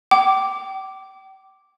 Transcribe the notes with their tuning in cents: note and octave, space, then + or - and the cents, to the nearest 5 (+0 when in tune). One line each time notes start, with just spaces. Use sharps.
G5 -35 D6 +0